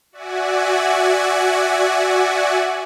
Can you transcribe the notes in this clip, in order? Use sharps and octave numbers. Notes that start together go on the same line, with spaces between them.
F#4 D5 E5 F#5 G#5